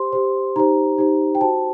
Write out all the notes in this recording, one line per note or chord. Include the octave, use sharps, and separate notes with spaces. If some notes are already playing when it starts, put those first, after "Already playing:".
Already playing: G4 C5 C6
G4 C5
D#4 G4 C5 A#5
D#4 G4 C5
G5
F#4 C5 A5